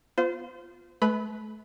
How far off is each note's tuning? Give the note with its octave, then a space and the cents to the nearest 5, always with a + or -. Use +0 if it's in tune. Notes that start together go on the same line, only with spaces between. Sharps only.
B3 +0 F4 +0 C5 -30
A3 -35 B4 +0 B5 +10